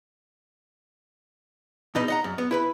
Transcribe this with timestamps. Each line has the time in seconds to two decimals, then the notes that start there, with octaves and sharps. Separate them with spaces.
1.95 E2 B2 D#4 B4 D#5 B5
2.08 D#5 F#5 A#5
2.24 F#2
2.38 B3
2.51 E4 B4 B5